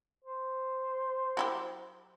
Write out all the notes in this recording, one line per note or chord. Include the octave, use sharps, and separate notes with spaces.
C5
F#3 E4 G4